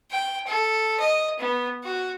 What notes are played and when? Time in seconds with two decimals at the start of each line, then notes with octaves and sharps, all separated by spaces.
0.11 G5
0.47 A4
0.99 D#5
1.39 B3
1.84 F#4